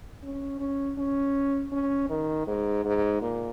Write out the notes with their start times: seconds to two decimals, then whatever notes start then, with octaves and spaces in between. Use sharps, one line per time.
0.23 C#4
0.59 C#4
0.98 C#4
1.72 C#4
2.10 D#3
2.47 G#2
2.85 G#2
3.22 A#2